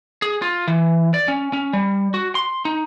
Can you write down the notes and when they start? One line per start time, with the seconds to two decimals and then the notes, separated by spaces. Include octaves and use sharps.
0.22 G#4
0.42 F4
0.68 E3
1.14 D5
1.28 C#4
1.53 C#4
1.73 G3
2.14 F#4
2.35 C6
2.65 D#4